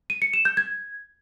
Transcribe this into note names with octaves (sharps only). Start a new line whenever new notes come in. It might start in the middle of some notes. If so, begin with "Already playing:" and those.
D#7
C#7
E7
G6
G#6